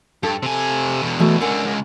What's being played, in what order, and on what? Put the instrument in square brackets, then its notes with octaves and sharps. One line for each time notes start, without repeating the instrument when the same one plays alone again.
[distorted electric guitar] G2 [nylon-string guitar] A4
[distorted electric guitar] C3 G#5
E2 B2
[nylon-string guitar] E3 A3 F#4
[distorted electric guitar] C#2 D3 [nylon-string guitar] A#4 F#5 G#5
[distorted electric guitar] C#2